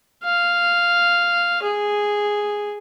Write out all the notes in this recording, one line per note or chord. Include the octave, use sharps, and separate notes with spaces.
F5
G#4